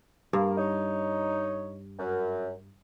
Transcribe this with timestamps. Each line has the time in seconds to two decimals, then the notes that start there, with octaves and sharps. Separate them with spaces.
0.33 G2 A#3
0.58 D#4 C#5
1.99 F#2